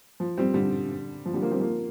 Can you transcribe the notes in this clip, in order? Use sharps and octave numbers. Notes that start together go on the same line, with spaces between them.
F3
G3 C4
D3 G3
F3
D3 G3
F3 A#3
G3 C4
F3 A#3